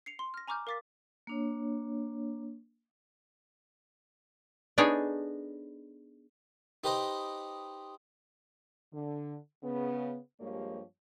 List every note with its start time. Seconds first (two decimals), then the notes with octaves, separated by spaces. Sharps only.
0.06 C7 C#7 F7
0.19 C6
0.34 F6 A#6
0.48 G#5 A#5 C#6 D6 F6 G6
0.67 A#4 F5 D6 A6 B6
1.27 A#3 D4 C#5
4.78 B3 D4 D#4 G#4 A4 C#5
6.84 D#4 G4 B4 C5 D#5
8.92 D3
9.63 C#3 B3
10.40 G2 F3 G#3 A#3 G4 C#5